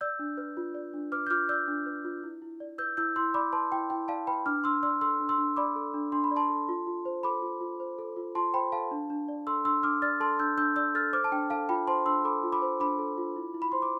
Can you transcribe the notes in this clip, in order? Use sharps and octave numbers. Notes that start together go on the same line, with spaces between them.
D5 E6 G6
D4
B4
F4
D5
D4
B4 D6 F6
G6
F4 D6 F6
D5 E6 G6
D4
B4
F4
E4
E4
D5
B4 E6 G6
E4 E6 G6
E4 C6 E6
D5 B5 D6
B4 A5 C6
E4 G5
E4 G5
D5 F5 A5
B4 G5 B5
D4 D6 F6
D4 C6 E6
D5 C6 E6
A4 C6 E6
D4
C6 E6
D4
D5 B5 D6
A4
D4
D4 C6
B5
D5
A5 C6
A4
F4
F4
C5
A4 B5 D6
F4
F4
C5
A4
F4
F4 A5 C6
C5 G5 B5
A4 F5 A5
D4
D4
D5
A4 C6 E6
D4 C6 E6
D4 D6 F6
D5 F6 A6
A4 A5 C6
D4 E6 G6
D4 E6 G6
D5 E6 G6
A4 F6 A6
C5 D6 F6
A5
D4 G5
A4 F5 A5
F4 G5 B5
C5 A5 C6
D4 C6 E6
A4 B5 D6
F4
B5 D6
C5
D4 B5 D6
A4
F4
E4
E4
B5
C5 C6
D6